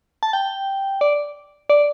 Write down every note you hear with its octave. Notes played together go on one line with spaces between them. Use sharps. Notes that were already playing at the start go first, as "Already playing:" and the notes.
A5
G5
D5
D5